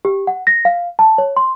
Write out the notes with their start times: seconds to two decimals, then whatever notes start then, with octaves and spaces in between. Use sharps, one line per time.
0.05 G4
0.27 F#5
0.47 A#6
0.65 F5
0.99 A5
1.18 C#5
1.37 C6